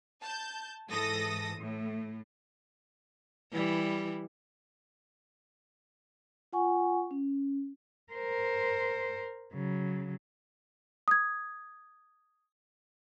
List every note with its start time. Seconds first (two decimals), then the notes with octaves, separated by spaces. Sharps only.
0.22 A5 G6
0.89 G#2 E3 A4 D#6 A#6
1.58 A2
3.52 E3 G3 E4
6.53 F4 F#5 G#5 C#6
7.11 C#4
8.13 A#4 C5
9.53 C#3 F#3
11.08 D#6 G#6